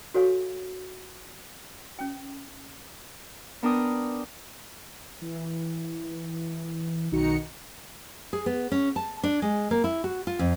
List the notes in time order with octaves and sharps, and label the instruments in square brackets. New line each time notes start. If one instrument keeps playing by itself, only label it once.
[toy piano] F#4 A4 C#5 F5 G#5
C#4 G5
[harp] B3 D4 A#4 G5 D#6
[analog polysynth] E3
B1 D#3 D#4 F#4 A#5 C#7
[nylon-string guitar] G#4
B3
C#4
A5
D4
G#3
A#3
E4
F#4
F4
F2